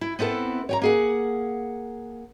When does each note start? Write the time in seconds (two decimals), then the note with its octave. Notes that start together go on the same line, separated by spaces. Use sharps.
0.01 E4
0.19 B3 C4 E4 A4 B4
0.69 C#5 G5 A#5
0.82 A#3 G#4 F#5